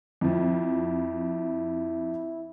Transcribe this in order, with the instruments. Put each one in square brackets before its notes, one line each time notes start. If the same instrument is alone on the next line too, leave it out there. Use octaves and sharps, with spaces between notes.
[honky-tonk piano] F2 F3 [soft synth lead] E4